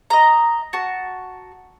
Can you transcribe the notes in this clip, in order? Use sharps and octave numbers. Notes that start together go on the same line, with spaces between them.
D#5 A#5
F#4 A5